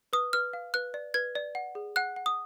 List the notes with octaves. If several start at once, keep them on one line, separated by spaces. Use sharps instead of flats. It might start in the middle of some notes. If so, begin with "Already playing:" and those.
B4 D#6
B4 F6
F5
B4 F#6
D5
B4 G#6
D5
F#5
G#4
F#5 F#6
F#5
D#6